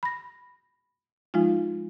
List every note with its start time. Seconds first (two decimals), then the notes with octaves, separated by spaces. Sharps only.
0.03 B5 A#6
1.34 F3 G#3 D#4 F4